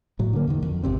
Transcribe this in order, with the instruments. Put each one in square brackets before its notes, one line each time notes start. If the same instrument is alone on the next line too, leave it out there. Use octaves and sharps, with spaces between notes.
[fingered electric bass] A2 F#3
D3 A#3
E2 D3 D#3
F2
G#1 C3 C4